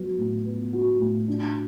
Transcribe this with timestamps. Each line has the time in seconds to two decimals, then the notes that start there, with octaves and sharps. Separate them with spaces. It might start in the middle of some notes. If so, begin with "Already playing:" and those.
Already playing: F#3 B3
0.18 A2
0.45 B3
0.73 F#4
1.00 A2
1.28 D4